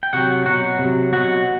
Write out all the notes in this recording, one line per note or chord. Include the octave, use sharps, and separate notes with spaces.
G5
C3 F#3 F#4 F#5
B2 F#3 F#4 F#5
C3
F#3
B2 F#3 F#4 F#5